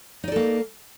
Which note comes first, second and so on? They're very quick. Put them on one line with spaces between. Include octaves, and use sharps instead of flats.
D#4 D5 A4 A#3